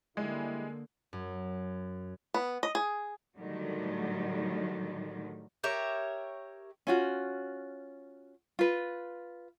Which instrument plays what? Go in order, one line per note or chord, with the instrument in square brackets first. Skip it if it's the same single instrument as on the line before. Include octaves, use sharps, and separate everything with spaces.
[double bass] D3 A#3 [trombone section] G3 E4 [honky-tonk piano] G#3
[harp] F#2
[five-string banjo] B3
D#5
G#4
[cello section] A2 D3 D#3 F#3 G3
[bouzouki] G4 A#4 C#5 E5
[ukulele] C#4 F4 F#4
F4 B4